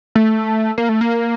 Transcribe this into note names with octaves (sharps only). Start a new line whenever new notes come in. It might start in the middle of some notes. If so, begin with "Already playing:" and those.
A3
A#3
A3
A#3